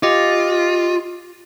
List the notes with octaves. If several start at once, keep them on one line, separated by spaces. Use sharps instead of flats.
F4 G4 D#5